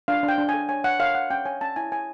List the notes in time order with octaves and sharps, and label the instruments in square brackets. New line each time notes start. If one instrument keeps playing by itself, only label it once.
[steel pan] D4 F5
D4
G5
D4
G#5
A4
C#5 G#5
C#5 F#5
C#5 F5
C#5 F#5
C#4 G5
C#5 G#5
C#4 A5
E4 G#5
C#5 G#5